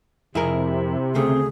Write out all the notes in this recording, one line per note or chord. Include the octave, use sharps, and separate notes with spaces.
F2 C3 E4 G#4 A#4
D2 C#3 A3 C4 G#4